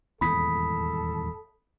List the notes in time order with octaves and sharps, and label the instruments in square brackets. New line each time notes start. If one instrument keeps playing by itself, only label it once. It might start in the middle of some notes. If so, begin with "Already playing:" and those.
[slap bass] D#1 E2 G#2 [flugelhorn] A4 [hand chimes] B5 D#6 B6